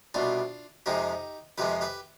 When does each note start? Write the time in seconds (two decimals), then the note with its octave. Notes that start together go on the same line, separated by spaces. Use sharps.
0.14 C2 B2 G3 D4 F4
0.86 F2 C3 F3 G#3 D#4 G4
1.58 F2 C3 F3 G#3 G4 B4
1.81 G4 B4